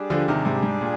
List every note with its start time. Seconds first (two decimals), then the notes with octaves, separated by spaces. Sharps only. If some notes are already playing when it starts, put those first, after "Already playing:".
Already playing: G3 D4 G#4
0.10 D3 F3
0.28 C3 D#3
0.45 G#2 C3
0.63 G#2
0.81 A#2